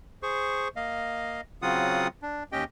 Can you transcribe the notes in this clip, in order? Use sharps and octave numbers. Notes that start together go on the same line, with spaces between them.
G#4 C5 C#6
A#3 D#5 F5
C#3 F#3 C4 F4 F#5 D#6
D4
D#2 C#4 G4 D#5 G5